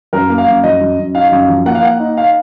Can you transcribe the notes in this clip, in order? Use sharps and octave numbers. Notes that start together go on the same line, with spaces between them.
F#2 A#4
A#3
F5
F#2
F#2 D#5
F#2
F#2
D#4 F5
F#2
F3
A#3 F#5
F5
A#3 F#5
D#4
F5